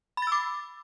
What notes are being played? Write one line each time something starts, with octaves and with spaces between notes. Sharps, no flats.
B5 D6 E6 A6